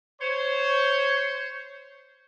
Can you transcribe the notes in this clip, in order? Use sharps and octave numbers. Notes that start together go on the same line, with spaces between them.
C5 C#5